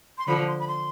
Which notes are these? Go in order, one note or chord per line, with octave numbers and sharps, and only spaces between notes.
C6
D3 F3 B5
C6
B5
C6